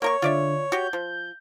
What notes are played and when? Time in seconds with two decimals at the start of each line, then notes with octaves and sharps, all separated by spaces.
0.02 A#3 A#4 C#5 C#6
0.22 D3 F4 D5 E5
0.72 F#4 G4 G6
0.93 F3